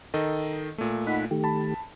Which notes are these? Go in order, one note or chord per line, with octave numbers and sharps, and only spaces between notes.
D#3 A4 D#5
A#2 A3
D#4 F#5 B5
D#3 A3 G4
A5 B5